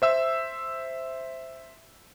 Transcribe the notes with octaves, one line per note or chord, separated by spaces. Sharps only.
C5 E5 E6